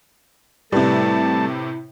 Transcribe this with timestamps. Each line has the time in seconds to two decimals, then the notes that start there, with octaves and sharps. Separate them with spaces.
0.72 A2 C3 G3 A3 E4 B4 A5